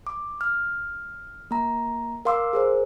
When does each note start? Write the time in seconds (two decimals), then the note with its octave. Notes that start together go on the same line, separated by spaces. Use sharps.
0.07 D6
0.41 F6
1.51 A#3 A#5
2.25 A#4 F5 C6 D6 E6
2.53 G#4 A#4 C5